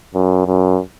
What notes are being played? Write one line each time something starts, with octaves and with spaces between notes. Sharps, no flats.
F#2
F#2